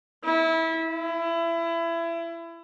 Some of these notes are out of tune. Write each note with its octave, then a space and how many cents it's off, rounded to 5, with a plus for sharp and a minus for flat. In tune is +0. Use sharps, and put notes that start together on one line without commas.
E4 -20
E4 +25